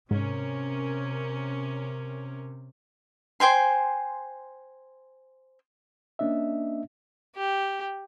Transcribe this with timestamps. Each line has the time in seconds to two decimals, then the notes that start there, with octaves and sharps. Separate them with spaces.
0.11 G#2 C3 C#4 A#4
3.40 C5 G5 G#5 C6
6.19 A#3 C#4 D4 D#5 E5
7.36 G4